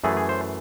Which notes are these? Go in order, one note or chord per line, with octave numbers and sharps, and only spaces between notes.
F#2 E3 A3 G#4
G#4
C5